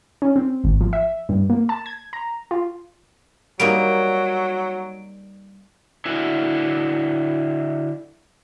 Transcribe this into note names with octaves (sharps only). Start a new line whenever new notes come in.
C#4
C4
G#1
F3
E5
G2
A#3
A5
G#6
A#5
F4
F#3 G3 A#3 D#4 D7
D3 E4 F#4